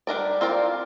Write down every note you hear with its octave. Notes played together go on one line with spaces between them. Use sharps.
G3 D4 F4 A#4 D5
C4 F4 A#4 D5